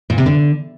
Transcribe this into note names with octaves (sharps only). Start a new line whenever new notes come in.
A#2
C3
D3